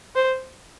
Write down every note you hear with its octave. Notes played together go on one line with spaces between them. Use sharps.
C5